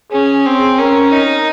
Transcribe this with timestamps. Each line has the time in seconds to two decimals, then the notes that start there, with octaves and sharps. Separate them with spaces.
0.12 C#4 G#4
0.46 C4
0.79 C#4 A#4
1.12 D#4